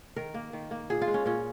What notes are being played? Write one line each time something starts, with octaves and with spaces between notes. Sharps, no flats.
D#3 A#4
A#3
D#3
A#3
A#2 G#4
F4
G#3
C#4
A#2 C#4